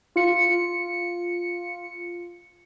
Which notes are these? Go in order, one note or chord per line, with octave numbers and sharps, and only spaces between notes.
F4 C#7